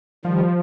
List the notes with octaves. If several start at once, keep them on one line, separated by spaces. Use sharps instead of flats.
D#3 F3 G3